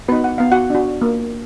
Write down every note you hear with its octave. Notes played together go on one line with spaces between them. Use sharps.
B3 D#4 F#4 B4
F#5
B3 F5
F#4 F#5
D4 F#4
A#3